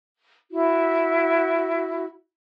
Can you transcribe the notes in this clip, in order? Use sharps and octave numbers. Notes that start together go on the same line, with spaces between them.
E4 F#4